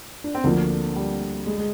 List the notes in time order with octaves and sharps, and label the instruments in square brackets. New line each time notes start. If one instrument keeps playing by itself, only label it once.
[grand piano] D4
C4
[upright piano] D2 D3 F3 [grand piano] A#3
[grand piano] G3
G#3
G#3